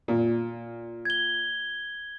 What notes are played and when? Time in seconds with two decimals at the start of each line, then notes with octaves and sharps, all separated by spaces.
0.08 A#2
1.05 G#6 G7